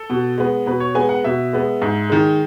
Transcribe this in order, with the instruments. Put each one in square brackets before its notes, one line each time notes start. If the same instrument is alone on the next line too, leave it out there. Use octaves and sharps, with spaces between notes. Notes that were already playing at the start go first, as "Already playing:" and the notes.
Already playing: [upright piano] A4
B2
G#3 B3
B2 B4
C#5
G#3 B3 G#5
F#5
B2 E5
G#3 B3
G#2
D#3 G#3